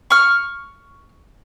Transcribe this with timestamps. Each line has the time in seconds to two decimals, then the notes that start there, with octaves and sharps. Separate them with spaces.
0.10 C#6 F6